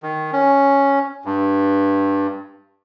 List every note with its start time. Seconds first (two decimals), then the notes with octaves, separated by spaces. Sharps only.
0.03 D#3
0.33 C#4
1.25 G2